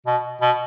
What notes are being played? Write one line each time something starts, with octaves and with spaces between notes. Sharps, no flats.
B2
B2